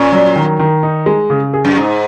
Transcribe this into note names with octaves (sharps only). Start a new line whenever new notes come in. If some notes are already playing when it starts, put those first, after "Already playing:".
Already playing: A#2 C#4
F#3
D#3
D#3
D#4
G#3
C#3
G#4
F#2
G#2 D#4